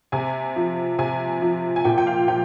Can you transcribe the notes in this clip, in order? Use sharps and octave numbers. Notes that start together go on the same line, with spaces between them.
C3 G#5
F3
C3 G#5
F3
G#5
A#2 G5
G5
F5
F3 G5